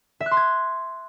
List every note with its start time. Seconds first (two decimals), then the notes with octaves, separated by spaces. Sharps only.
0.20 E5
0.26 F#6
0.31 C6
0.37 G#6